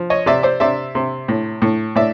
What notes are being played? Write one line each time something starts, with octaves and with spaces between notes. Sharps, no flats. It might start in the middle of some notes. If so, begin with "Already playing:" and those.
Already playing: F3
C#5 D#5
C3 D5 E5
C5 D5
C3 D5 E5
C3
A2
A2
A2 D5 E5